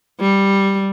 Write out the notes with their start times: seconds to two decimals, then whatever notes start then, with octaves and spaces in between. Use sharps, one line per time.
0.20 G3